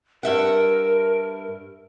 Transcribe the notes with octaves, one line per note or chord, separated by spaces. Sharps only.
G2 A#4 E5 F#5